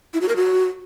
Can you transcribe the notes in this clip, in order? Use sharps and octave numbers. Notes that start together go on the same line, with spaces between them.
E4
F#4
A#4
F#4